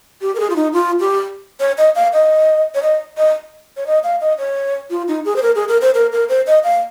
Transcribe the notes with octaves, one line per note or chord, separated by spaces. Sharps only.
G4
A#4
G#4
F4
D#4
F4
G4
C#5
D#5
F5
D#5
C#5
D#5
D#5
C#5
D#5
F5
D#5
C#5
F4
D#4
G#4
C5
A#4
G#4
A#4
C5
A#4
A#4
C5
D#5
F5